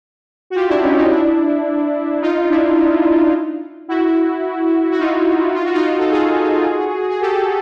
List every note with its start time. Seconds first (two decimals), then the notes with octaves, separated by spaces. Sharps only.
0.50 F#4
0.55 F4 G4
0.68 D4 E4
0.82 C#4 D#4
0.96 C#4 D#4
1.10 D4 E4
2.21 D#4 F4
2.49 D4 E4
3.88 E4 F#4
4.92 F#4
4.99 D#4 F4
5.55 F4
5.65 F#4
5.74 D#4 F4
5.99 A4
6.11 F#4 G#4
7.09 G#4
7.21 G4 A4